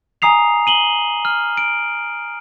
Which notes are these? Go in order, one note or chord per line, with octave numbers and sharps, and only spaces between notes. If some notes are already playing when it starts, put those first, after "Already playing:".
G#5 A#5 D#6 C7 F7
D#7 F#7 G7
F6
D7